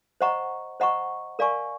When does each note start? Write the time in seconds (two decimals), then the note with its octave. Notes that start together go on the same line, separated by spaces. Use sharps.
0.21 C5 D#5 F#5 A#5 C#6
0.80 C5 D#5 F#5 A#5 C#6
1.39 A#4 D5 F5 G#5 C#6